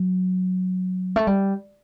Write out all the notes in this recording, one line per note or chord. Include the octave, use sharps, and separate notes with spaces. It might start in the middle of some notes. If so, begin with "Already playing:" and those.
Already playing: F#3
A3
G3